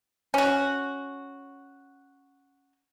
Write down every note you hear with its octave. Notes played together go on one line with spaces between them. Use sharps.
C#4 F#4